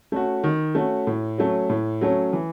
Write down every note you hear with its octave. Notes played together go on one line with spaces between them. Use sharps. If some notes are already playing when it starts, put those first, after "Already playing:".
A3 C#4 F#4
D#3
A3 C#4 F#4
A2
F#3 A3 C#4
A2
F#3 A3 C#4
E3